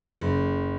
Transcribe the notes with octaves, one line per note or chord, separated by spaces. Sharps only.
F#1